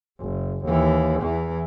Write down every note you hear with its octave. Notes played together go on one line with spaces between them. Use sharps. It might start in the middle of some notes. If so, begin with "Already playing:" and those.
F#1
D#2 E3
E2 E3